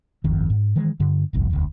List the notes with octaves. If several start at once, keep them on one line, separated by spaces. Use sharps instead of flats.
D1 G1 F2 D#3
G#2
D#3 E3 G#3
G2 D3
G1 C2 F2
E1 D2